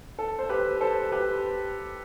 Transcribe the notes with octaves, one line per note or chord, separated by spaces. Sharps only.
A4
C5
G4 B4
A4 C5
G4 B4